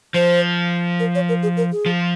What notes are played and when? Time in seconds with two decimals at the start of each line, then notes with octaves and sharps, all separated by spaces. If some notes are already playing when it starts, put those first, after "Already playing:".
0.14 F3 C5
1.00 A#4
1.15 C#5
1.29 A#4
1.43 G#4
1.57 A#4
1.72 G#4
1.86 F3